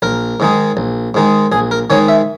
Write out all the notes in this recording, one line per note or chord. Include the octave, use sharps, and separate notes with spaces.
A#1 A#4
G#2 D#3 G#3 D#4
A#1
G#2 D#3 G#3 D#4
A#1 G#4
A#4
G#2 D#3 G#3 D#4 C#5
E5